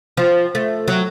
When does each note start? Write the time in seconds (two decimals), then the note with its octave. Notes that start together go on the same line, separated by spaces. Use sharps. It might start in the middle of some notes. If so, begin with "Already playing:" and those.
0.17 F3
0.55 A3
0.88 F#3